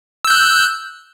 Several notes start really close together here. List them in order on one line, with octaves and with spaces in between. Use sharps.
E6 G6 F#6